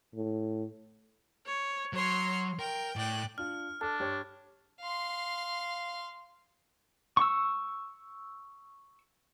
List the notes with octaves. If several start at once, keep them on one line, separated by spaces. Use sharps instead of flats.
A2
C#5
F#3 C#5 C6 F6
A#4 G5
A2 D5 G5 F#6
D4 F4 F6
D4 A4 A5 F6
G2 G4 C#5
F5 C6
C#6 E6